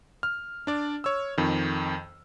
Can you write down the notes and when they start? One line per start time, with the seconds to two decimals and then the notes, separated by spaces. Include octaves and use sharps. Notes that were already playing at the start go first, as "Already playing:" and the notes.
0.23 F6
0.67 D4 D5
1.04 C#5 E6
1.38 F2 D#3